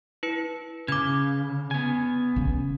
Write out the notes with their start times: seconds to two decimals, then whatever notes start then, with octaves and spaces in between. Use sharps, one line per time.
0.23 E4 B4 C#7
0.88 C#3 D6 G#6
1.71 B3 G#5
2.36 C#3 C#4